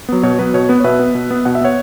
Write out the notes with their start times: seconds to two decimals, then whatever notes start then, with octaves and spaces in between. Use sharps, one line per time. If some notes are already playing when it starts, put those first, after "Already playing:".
0.09 F#3 B3
0.23 B2 C#5
0.38 F#3 B3 B4
0.54 B2 C#5
0.69 B3 B4
0.80 C#5
0.84 B2 B4 E5
0.99 B3
1.15 B2
1.31 B3
1.45 B2 F#5
1.55 E5
1.61 B3 C#5 F#5